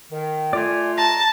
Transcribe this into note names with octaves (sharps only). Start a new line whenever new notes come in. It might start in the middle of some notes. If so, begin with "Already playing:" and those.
D#3
A3 F4 D5 G#5
A5 A#5